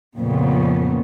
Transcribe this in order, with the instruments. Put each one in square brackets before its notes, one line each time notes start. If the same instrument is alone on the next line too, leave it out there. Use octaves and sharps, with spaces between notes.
[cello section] F2 A#2 C#3 B3